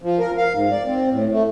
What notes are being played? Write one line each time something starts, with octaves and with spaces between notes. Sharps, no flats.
F3
A#4
F5
G#2
D5
C4
A2
A3